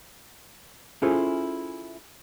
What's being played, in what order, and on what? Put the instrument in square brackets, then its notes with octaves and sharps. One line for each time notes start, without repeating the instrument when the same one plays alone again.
[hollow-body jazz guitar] C#4 E4 F4 G#4 A4 C5